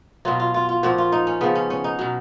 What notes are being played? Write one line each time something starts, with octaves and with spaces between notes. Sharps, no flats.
B2 F#3 F4
F4
F4
F4
A#2 F3 F#4
F4
D#4
C#4
C#3 F3 B3
C#4
C#4
D#4
B2 F#3